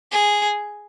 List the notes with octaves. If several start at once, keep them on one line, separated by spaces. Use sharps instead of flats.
G#4